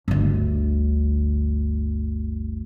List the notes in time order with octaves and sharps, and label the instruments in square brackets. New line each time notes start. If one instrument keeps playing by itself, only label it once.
[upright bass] G1 D2